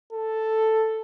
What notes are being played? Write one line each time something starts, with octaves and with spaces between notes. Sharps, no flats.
A4